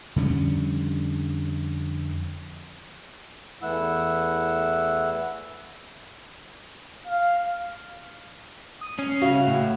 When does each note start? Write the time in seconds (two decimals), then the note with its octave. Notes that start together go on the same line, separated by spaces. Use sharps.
0.16 F2 D3 G3 C#4
3.62 E2 E3 A3 E4 F#5 E6
7.07 F5
8.81 D#6
8.99 C#4 C7
9.22 C#3 F#4 E5 F5
9.47 A2